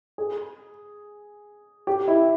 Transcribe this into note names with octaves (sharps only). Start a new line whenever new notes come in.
G#4
G4
E4